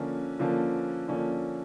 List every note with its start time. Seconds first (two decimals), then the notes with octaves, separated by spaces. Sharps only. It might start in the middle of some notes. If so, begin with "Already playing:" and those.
Already playing: D3 F3 A#3 C#4
0.39 D3 F3 A#3 C#4
1.08 D3 F3 A#3 C#4